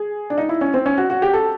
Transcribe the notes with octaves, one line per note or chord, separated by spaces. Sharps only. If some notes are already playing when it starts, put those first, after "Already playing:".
Already playing: G#4
D4
D#4
E4
C#4
C4
C#4
F#4
F#4
G4
A4